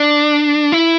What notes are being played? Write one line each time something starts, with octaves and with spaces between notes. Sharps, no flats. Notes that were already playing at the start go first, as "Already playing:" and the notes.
Already playing: D4
E4